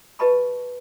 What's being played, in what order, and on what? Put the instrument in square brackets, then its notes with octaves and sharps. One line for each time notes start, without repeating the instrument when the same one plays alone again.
[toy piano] G4 B4 D#5 A5 B5 C#6